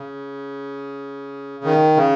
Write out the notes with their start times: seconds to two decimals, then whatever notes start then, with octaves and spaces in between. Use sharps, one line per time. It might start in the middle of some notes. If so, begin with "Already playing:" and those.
Already playing: C#3
1.64 D#3
1.97 C#3